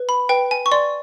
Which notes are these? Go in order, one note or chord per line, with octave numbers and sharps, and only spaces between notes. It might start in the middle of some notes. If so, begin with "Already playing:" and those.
Already playing: B4
B5
B4 G5
G#5
C#6
D5 C6